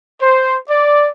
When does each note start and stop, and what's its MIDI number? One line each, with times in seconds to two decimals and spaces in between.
0.21 0.57 72
0.69 1.07 74